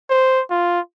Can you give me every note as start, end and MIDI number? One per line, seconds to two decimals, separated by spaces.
0.10 0.42 72
0.50 0.80 65